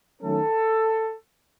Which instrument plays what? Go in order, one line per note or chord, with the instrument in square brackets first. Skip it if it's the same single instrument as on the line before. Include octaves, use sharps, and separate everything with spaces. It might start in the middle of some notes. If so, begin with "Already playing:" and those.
[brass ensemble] D#3 F#3 A3 C#4 A4